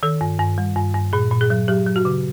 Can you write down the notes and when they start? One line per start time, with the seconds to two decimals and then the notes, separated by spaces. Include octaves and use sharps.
0.03 D#3 A4
0.21 G2
0.40 G2
0.58 G3
0.76 G2
0.94 G2
1.13 A#2 G#4
1.31 A#2
1.41 G#4
1.50 F#3
1.68 F#3 G4
1.87 F#3
1.96 F#4
2.05 C#3